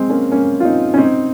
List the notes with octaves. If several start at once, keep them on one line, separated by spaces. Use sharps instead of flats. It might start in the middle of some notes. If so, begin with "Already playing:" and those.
Already playing: G#3 C4
A#3 C#4
A#3 C#4
F4
C4 D#4
C#4
C4 D#4